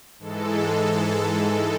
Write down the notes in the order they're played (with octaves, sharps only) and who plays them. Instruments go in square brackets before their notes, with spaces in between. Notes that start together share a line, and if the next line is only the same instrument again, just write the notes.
[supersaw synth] G#2 E3 G#3 A4